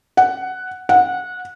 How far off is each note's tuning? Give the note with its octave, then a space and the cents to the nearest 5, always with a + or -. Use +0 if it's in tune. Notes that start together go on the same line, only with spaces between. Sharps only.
F#5 +5
F#5 -20